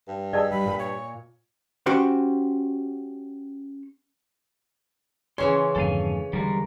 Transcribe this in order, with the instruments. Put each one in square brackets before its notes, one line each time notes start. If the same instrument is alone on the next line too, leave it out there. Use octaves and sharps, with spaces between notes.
[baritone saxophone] G2
[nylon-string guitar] G#4 [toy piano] D5 D#5 A5 [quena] E6
[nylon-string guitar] G3 [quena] B5
[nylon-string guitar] A#2 A#3
[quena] C#5
[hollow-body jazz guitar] C#4 F#4 G4 C5
[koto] C#3 E3 C#4 [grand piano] C#5 [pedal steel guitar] C6
[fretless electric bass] F2 G#2 D3 [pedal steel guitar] A4 F5 G#5
[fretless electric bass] E2 D3 [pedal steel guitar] G3 G#3 A#4